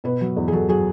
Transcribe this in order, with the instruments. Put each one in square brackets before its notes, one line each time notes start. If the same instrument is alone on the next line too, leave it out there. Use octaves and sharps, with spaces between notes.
[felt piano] B2 B4
F#3
E2
G#4
F#3 A4
F#3 G#4